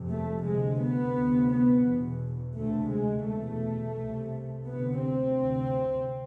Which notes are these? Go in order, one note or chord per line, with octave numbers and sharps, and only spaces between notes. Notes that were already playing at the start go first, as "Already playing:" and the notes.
Already playing: F2 C3
A3
D2 C3 G#3
B3
D2 C3
B3
E2 B2
D2 C3 A3
G#3
E2 B2 A3
C2 C3
D2 C3 B3
C4
D2 C3